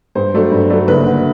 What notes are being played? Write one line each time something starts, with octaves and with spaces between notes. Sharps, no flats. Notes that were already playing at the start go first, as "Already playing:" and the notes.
G2 C5
F#3 A3 D4
G2
F#3 A3 D4
F#1 B4
D3